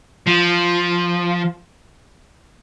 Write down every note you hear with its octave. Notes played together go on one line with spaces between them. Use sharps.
F3